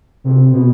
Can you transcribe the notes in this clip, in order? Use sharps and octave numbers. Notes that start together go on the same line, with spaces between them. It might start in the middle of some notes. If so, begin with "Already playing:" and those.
C3
B2